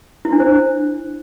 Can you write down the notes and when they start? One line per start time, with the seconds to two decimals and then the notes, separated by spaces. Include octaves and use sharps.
0.25 E4
0.32 D4
0.40 C5